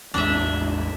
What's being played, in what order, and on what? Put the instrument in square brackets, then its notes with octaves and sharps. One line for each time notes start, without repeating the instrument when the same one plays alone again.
[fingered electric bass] A1 E2 G#3 [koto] D4 E5